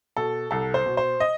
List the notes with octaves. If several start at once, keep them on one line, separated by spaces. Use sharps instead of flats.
B2 A4
C2 A4
C5
B2
C5
D#5